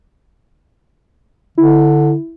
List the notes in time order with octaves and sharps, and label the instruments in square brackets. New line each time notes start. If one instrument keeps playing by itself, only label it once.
[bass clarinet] D3 [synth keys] E4